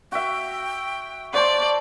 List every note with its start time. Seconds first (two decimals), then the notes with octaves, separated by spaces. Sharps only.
0.12 F#4 E5 G5
1.33 F#4 C5 D5 A5